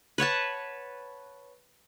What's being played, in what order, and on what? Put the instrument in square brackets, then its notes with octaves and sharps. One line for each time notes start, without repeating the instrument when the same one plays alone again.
[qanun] B4 C#5 F#5 A5